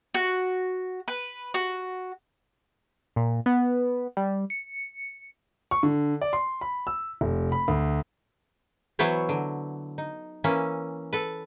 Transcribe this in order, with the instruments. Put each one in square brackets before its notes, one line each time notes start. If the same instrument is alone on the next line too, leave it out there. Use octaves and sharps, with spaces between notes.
[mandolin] F#4
B4
F#4
[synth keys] A#2
B3
G3
C#7
[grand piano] C#6
D3
D5
C6
B5
E6
F1
B5
D2
[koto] E3 F#3 B3 E4 C5 C#5
D3 F#3
D#4
E3 A#3 C#4 E5
A4 B4